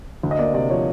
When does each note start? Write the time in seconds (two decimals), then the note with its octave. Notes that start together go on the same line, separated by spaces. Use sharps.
0.23 D2
0.31 D#5
0.39 A#3 D5
0.54 C3 D5
0.70 F3 C#5